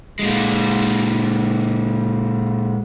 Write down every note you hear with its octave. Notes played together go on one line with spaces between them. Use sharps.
A#2 G#3